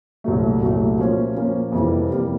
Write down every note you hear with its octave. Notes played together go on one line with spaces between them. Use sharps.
C2 A#2 F#3 A3
C2 A#2 F#3 A3
A#2 F3 A#3 C#4
A#2 F3 A#3 C#4
F2 C3 E3 G3 A#3
F2 C3 E3 G3 A#3